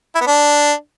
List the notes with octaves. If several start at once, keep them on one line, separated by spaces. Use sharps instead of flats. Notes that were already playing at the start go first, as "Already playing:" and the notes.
E4
B3
D4